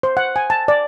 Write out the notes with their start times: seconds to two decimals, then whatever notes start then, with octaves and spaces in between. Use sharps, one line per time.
0.03 C5
0.17 F#5
0.36 G#5
0.50 A5
0.68 D5